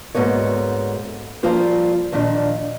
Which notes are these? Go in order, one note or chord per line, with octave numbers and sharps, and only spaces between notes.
D2 G#2 A#3 B3 C#5
F3 G3 A#3 F4 C5
A#2 D#3 F3 D4